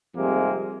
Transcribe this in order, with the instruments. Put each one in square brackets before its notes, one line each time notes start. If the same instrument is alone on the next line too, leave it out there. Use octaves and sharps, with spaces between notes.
[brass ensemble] F2 C3 D#3 G3 G#3 A#3